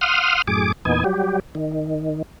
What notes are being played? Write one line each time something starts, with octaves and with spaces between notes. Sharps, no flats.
F5 F#5 C6 D#6 F6
F#2 A2 G#4 D6
E2 A#2 B3 D#4 G#5
F#3 G3 G4
D#3